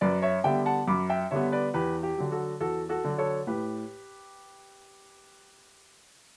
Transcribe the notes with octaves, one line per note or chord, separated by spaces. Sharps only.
F#2 B4 D5
C#5 E5
D3 G3 B3 E5 G5
F#5 A5
F#2 B5 D6
E5 G5
D3 G3 B3 C#5 E5
B4 D5
E2 G4 B4
G4
D3 F#3
F#4 A4
E2 F#4 A4
F#4 A4
D3 F#3
A4 C#5
A2 G4 B4